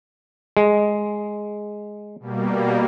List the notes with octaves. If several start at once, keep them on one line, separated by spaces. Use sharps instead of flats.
G#3
B2 G3 A#3